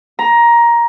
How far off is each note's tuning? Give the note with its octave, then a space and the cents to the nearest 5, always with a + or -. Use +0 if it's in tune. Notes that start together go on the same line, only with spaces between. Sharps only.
A#5 +15